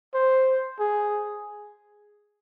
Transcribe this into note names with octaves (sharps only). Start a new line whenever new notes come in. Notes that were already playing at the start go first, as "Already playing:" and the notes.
C5
G#4